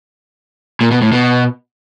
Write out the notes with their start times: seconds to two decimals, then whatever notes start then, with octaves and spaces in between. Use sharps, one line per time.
0.81 A#2
0.91 B2
1.02 A2
1.12 B2